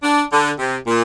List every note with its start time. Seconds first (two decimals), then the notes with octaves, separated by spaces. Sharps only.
0.03 D4
0.31 D3
0.59 C3
0.87 A#2